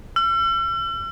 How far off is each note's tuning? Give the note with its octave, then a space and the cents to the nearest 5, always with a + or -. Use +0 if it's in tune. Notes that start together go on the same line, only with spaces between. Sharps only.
E6 +45